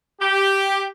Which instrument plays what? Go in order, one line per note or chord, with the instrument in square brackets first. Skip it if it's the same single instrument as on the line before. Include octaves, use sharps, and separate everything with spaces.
[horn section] G4